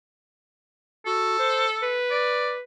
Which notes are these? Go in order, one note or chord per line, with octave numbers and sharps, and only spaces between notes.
F#4 A4
C5
B4
D5